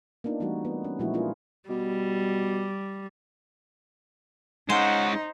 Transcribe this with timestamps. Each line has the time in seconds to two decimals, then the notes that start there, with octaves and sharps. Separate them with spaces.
0.24 A#3 B3 D4 D#4 F4
0.40 E3 G3 A3 C4 D#4 F#4
0.65 B3
0.85 C#4
0.99 A#2 F3 G#3 D#4 E4 F#4
1.14 A#3 D4 E4 F4 G#4 B4
1.69 B2 G3
4.70 G#3 C#4 D#4 C5 F#5